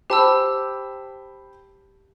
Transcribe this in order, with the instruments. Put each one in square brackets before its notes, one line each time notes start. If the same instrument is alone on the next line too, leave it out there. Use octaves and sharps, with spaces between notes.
[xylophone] G4 A5 E6 [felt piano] C5 G5 B5